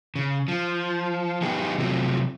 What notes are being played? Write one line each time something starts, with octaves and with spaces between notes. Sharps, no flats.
C#3
F3
B3 D#4 G4 G#4
C3 F3 F#3 A3